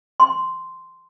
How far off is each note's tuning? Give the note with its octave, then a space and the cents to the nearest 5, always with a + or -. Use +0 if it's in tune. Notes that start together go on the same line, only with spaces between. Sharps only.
C6 -5